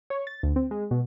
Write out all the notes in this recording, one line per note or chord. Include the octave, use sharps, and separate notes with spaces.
C#5
A6
D2
C4
G#3
B2